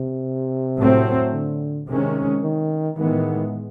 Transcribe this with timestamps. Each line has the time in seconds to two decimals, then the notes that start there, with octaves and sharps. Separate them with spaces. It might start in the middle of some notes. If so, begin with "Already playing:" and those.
Already playing: C3
0.78 A2 F#3 A3 C4
1.32 D3
1.87 C3 D#3 G#3 C#4
2.43 D#3
2.97 A2 D#3 E3 G#3 B3